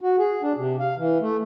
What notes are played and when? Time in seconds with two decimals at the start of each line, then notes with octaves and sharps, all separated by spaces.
0.01 F#4
0.19 G#4
0.42 D4
0.58 C3
0.80 F5
0.97 E3
1.21 A3